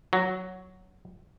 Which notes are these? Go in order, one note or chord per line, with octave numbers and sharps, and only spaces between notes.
F#3